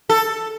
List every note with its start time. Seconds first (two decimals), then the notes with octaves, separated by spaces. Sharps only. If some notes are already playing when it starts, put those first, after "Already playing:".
0.09 A4